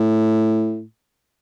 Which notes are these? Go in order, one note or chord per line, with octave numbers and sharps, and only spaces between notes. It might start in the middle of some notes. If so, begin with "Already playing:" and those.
Already playing: A2